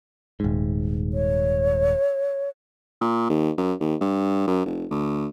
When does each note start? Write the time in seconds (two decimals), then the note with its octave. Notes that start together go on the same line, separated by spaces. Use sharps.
0.40 D#1 G#2
1.13 C#5
3.01 A#2
3.30 D#2
3.58 F#2
3.80 D#2
4.01 G2
4.47 F#2
4.66 F1
4.91 D2